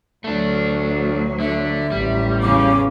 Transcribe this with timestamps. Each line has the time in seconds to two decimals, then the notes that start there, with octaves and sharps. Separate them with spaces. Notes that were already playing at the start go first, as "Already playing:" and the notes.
0.24 D2 F#3 A3 D4
1.40 D3 E5
1.91 A1 G3
2.42 E2 C#3 D6